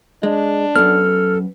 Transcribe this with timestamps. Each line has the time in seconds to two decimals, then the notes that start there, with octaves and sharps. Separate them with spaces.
0.23 G#3 D4
0.76 F#2 B3 A4 F6